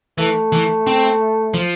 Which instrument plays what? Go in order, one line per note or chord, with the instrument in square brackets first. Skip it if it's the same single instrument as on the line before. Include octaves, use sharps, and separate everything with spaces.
[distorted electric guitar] E3 [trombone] A3
[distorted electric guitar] E3
C4
F3